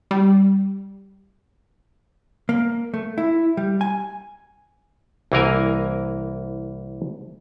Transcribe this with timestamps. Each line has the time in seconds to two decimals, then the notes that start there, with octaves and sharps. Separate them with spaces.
0.11 G3
2.49 A#3
2.94 A3
3.18 E4
3.57 G3
3.81 G#5
5.32 C2 E3 A#3 A#4 G#5